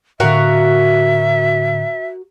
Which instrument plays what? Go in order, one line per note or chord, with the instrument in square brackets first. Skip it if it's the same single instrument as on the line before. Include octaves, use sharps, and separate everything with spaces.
[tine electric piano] A2 D3 [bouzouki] F#4 A#4 F5 [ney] E5